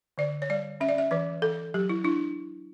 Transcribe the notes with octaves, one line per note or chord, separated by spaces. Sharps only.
D3 D5
C#5
G3 D5
C#4 E5
D5
E5
E3 B4
E3 A4
F#3 G4
E4
D4 E4